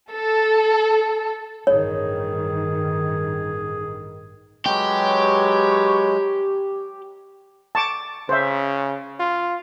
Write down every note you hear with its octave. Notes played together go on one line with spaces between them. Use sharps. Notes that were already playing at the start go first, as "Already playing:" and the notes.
A4
A1 G2 D#3 G#4 C#5
F#3 G#3 G4 B4 C#5
A5 C#6 D6
C#3 C5 E5
F4